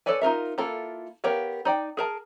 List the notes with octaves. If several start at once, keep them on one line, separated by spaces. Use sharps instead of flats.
A4 B4 C#5 D5 G#5
D#4 F4 A#4 E5
A#3 E4 F4 A4
B3 G4 A#4 C#5 F5
D#4 D5 G5
G#4 A#4 A5